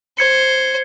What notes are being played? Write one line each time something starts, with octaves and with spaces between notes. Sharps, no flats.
C5 G#6 C#7